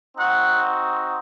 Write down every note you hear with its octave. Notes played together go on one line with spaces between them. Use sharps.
C4 D#4 F#4 F#5